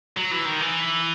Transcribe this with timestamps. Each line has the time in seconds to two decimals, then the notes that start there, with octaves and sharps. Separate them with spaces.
0.17 F#3
0.31 E3
0.45 D#3
0.60 E3